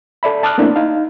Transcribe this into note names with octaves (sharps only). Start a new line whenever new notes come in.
A4 D5 E5 B5
A5 D6 D#6 F6 F#6
A3 A#3 C4 D4 E4
D#4 F5